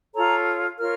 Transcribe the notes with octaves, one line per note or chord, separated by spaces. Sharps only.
F4 A4 C#5 A#5
F4 A#4 C#5 F6